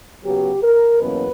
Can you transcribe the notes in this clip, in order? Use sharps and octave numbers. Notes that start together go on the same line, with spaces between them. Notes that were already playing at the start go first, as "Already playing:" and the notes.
C#3 F#3 B3 G4
A#4
E2 B2 F#3 A#3 C#4 B4